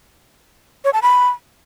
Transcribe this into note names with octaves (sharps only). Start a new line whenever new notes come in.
C#5
A5
B5